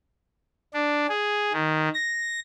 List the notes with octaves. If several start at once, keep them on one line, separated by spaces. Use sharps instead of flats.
D4
G#4
D#3
A#6